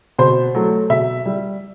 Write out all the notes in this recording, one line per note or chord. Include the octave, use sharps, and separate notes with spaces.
B2 C5
F#3 A3
B2 E5
G3